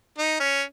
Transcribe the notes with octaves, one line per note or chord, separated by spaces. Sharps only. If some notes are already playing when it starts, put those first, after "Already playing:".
D#4
C#4